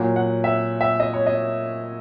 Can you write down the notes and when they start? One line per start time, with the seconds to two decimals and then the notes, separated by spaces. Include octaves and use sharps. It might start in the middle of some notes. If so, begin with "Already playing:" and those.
Already playing: A#2 F#3
0.16 F#5
0.44 E5
0.81 E5
1.00 D#5
1.14 C#5
1.27 D#5